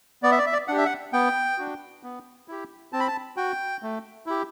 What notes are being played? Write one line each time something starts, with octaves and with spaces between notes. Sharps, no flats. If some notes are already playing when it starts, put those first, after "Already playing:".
B3 D5
E5
D5
E5
D5
D4 G4 F#5
E5
F#5
B3 G5
D4 F#4
B3
E4 G4
C4 A5
B5
A5
F#4 G5
A3
E4 G4